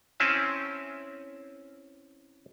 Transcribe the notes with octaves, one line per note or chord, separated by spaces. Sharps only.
C4 C#4 E4 G#5 A5